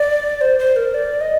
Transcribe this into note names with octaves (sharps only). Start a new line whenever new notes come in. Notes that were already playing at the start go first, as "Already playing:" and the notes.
Already playing: D5
C5
C5
A#4
D5
D#5